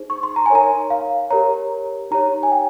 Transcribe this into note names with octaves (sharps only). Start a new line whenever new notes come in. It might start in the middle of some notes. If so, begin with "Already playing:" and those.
Already playing: D#4 G#4 C5
C#6
C6
A#5
G#5
D#4 A#4 C#5 A#5
F5
G4 A#4 C#5 A#5
D#4 G4 C#5 A#5
G#5
G5